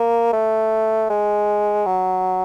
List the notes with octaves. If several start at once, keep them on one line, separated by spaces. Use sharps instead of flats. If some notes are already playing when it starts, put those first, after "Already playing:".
Already playing: A#3
A3
G#3
F#3